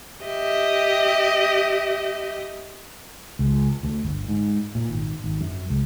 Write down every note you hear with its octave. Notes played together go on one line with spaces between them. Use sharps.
G4 D#5 E5
C#2
D2
G1
G#2
A#2
G#1
G#1
F#2
C#2